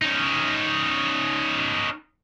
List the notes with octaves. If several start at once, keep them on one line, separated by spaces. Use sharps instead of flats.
C#4 D#4